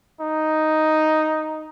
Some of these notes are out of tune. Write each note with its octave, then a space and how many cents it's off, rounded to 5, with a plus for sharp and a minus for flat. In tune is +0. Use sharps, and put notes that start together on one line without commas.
D#4 +0